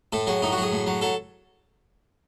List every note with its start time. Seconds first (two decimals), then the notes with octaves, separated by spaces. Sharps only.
0.13 A2 A4
0.27 F#3 G#4
0.42 A2 D#4
0.52 F#4
0.57 F#3 G#4
0.72 A2
0.87 F#3
1.01 F#3 A4